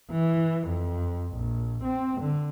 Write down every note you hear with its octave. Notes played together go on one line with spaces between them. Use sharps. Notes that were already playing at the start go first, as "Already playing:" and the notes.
E3
F2
A#1
C4
D3